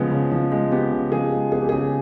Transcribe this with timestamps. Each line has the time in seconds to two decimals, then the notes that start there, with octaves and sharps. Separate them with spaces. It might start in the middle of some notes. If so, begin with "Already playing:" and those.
Already playing: C#3 F3 G#3 B3
0.12 C#3
0.32 F3
0.52 G#3
0.71 B3 G4
0.92 C#3
1.12 F3 G#4
1.32 G#3
1.52 B3 G#4
1.61 G4
1.69 C#3 G#4